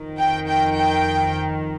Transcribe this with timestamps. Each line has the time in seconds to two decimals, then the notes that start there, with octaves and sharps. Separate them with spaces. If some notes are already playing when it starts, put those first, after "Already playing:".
Already playing: F2 D#3
0.19 G5
0.48 G5
0.76 G5